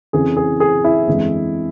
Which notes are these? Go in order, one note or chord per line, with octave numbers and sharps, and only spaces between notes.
F2 C#3 E3 G#4
G#4
G#4
E4
G1 F2 E3 G#3